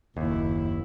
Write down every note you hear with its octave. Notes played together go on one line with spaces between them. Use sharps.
F#1 D#2 E4